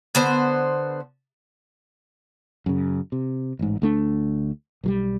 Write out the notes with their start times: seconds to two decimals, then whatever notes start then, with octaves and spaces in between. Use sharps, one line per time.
0.15 D3 B3 C5
2.66 F#2 C#3
3.12 C3
3.59 A1 G#2
3.82 D2 A3 D4
4.84 B1 F#3 G3